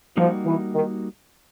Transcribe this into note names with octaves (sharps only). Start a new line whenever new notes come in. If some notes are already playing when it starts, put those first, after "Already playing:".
F3 G3 A#3 D#4 F#4
E3
D#3